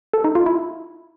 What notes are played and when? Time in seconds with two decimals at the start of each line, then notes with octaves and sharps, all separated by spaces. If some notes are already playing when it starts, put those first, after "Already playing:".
0.13 A4
0.24 D#4
0.35 F4
0.46 E4